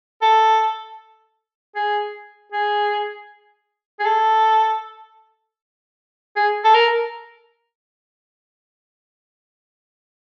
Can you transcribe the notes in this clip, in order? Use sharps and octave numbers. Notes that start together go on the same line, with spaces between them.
A4
G#4
G#4
G#4
A4
G#4
A4
A#4